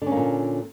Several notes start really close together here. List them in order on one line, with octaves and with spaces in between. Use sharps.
D3 C#4 A#3 A#2